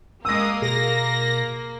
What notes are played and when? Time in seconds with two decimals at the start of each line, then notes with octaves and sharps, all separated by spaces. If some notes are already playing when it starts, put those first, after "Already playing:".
0.25 G#3 A#3 D#6 E6 A#6
0.62 B2 G#4 A#6